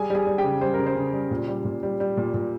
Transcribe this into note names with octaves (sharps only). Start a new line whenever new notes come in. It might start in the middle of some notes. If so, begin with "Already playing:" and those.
Already playing: G3 G#4 G#5
G3 G#4 G#5
G3
G4 G5
C#3
G3 C5
A#4
C#3
C5
C#3
G3
A#2
G3
A#2
G3
G3
A#2
A#2